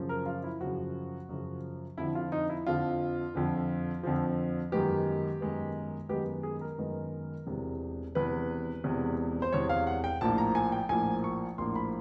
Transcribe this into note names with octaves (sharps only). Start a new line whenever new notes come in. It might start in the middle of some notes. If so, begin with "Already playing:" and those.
Already playing: F#2 C#3 F3
A#4
F4
E4
F#2 C#3 F3 F#4
F#2 C#3 F3
F2 D3 F3 E4
F4
D#4
E4
F2 D3 F3 F4
F2 D3 F3
F2 D3 F3
F#2 D#3 G#3 B3 G4
F#2 D#3 G#3 B3
F#2 D#3 G#3 B3 G4
G#4
A#4
F#2 D#3 G#3 B3
E1 E2 C3
E1 E2 C3 B4
E1 E2 C3
C5
E1 E2 C3 C#5
F5
F#5
G5
A#1 A2 F3 A#3 A5
A#5
G#5
G5
A#1 A2 F3 A#3 G#5
C#6
A#1 A2 F3 A#3 C6
B5